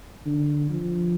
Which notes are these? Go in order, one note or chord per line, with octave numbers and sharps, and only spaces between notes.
D3
F3